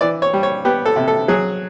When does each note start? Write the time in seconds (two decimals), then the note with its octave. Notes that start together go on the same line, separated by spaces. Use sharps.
0.01 E3 D5
0.22 C#5
0.33 G3
0.43 C#5
0.65 B3 G4
0.86 A4
0.96 C3
1.08 A4
1.28 F#3 G#4